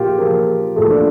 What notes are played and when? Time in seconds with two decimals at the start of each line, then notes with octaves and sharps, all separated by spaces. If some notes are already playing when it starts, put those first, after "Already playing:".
Already playing: A#2 F3 F4 G4
0.18 A#2 F3 A#3
0.76 A#2 F3 A3
0.90 D4